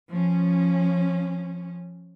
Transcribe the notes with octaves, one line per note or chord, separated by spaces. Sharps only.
F3 C#4